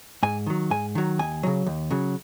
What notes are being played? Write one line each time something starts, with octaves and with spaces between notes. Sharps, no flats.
G#2 G#5
D#3 F#3
G#2 G#5
D#3 F#3
D#2 G#5
C#3 F#3
D#2
C#3 F#3